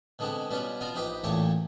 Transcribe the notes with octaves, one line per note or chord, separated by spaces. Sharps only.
B2 D3 G#3 B3 C4
B2 G3 B3 C#4 F4
B2 B3 F4 F5 A#5
A#1 D#4 G4 B4 B5
A1 E2 A#2 A3 G4 C#5